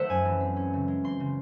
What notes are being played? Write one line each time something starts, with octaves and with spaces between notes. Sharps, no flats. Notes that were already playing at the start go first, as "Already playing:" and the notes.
Already playing: D#3 A3 C5 E5 F#5
F#2 G#5
E3
C4
C#4
C#3
G#3
C4 C6
C#3